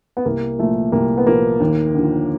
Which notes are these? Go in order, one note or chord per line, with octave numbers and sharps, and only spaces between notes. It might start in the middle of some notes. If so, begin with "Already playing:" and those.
B3
C2 A#3
A#2 F3 A3
C2 A#3
B3
A#2 F3 A#3
D#2
D3 F3